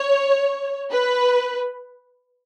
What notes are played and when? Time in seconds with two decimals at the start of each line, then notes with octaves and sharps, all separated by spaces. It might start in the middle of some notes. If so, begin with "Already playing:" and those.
Already playing: C#5
0.92 B4